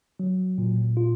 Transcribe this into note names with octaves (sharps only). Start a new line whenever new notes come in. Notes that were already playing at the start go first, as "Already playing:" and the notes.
F#3
A#2
F4